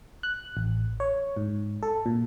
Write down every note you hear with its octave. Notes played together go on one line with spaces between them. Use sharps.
F#6
A1
C#5
G#2
A4
A#2